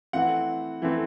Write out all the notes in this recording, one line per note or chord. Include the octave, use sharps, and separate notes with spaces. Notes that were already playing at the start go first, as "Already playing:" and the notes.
E3 A3 C4 F#5
E3 A3 C4